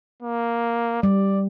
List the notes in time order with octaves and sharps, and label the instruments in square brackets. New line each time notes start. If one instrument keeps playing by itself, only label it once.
[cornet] A#3
[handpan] G3 [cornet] D5